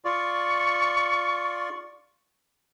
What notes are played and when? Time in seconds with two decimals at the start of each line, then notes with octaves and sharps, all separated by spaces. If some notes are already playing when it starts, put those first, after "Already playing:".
0.05 F4 D5 C#6